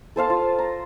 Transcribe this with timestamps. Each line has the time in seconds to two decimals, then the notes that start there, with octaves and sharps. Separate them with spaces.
0.16 A4 C5 F5 A5
0.30 F4
0.59 A#5